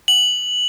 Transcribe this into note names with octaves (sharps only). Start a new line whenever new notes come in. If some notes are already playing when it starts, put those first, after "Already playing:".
F#7